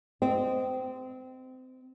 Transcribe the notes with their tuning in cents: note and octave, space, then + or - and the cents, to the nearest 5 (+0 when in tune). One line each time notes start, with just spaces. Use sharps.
C4 -25 D#5 +0